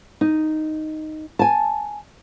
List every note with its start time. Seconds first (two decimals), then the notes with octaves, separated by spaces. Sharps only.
0.21 D#4
1.39 G#5 A5